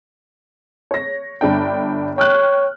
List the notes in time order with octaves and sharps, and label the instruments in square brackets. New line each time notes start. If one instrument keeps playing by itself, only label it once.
[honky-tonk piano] C#5 A#6
G1 D4 G5
[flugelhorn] C#5 [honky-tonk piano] G5 F6 F#6